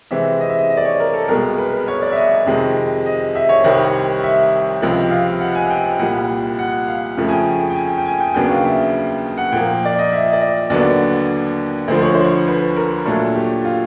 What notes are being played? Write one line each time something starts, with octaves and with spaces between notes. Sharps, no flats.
C3 E3 G#3 C4 E5
D#5
E5
D#5
D#5
D5
C#5
A#4
A4
C2 B2 G#3 A#4
B4
C#5
D5
E5
D#5
F2 C3 D#3 G#3
D#5
E5
C#5
C2 C3 D#3 G3 C4
E5
C#2 C3 F3
F5
F#5
G#5
G5
C2 A#2 G3 F#5
F#5
F5
F2 C#3 F3 A3
G#5
G5
G5
G#5
G5
G#5
G5
D#2 C#3 F#3 B3 D4 G5
F5
E5
F#5
A#2 F3 A#3 G5
D5
D#5
E5
D5
D#5
D#2 D3 F#3 B3 D5
D2 D3 F3 C5
C#5
C5
B4
A#4
A#2 F#3 A3 D4 A4
G4
F4